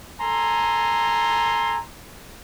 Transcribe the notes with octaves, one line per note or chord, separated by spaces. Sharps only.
A4 G#5 A#5 C6